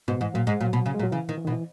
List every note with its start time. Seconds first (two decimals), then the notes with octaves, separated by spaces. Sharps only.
0.08 G#2 B2
0.21 G#2 E3
0.34 A#2 F#3
0.47 G#2 G#3
0.60 A#2 F#3
0.73 B2
0.86 C#3
0.95 G#3
0.99 A#2
1.03 F#3
1.12 C#3 E3
1.29 D#3
1.37 E3
1.45 B2 D#3
1.52 E3